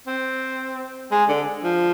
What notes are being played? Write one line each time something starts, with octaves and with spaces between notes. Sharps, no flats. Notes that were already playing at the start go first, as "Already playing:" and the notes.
C4
G#3
D3
F3